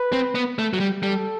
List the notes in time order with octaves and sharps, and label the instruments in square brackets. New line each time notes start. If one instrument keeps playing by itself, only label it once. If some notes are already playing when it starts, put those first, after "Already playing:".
Already playing: [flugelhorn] B4
[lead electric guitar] C4
B3
A3
F#3
G3
[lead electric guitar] G3 [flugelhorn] A4